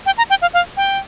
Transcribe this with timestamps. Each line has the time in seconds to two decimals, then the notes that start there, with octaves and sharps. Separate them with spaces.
0.06 G5
0.18 A#5
0.30 G5
0.42 F5
0.54 F5
0.77 G5